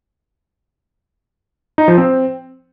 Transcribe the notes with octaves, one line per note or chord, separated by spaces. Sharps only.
D#4
F3
C4